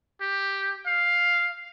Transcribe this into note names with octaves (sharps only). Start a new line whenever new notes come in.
G4
F5